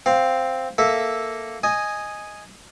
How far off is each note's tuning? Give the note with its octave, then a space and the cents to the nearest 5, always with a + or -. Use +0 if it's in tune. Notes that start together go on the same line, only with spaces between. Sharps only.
C4 +0 F5 +5
A#3 +0 A4 +0 E5 +0
D#5 -5 G#5 +0